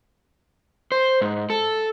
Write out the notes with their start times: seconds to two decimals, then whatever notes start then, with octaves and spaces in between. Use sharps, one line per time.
0.92 C5
1.21 G#2
1.50 A4